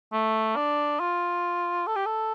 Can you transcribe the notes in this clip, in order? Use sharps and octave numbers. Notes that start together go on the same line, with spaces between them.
A3
D4
F4
A4
G4
A4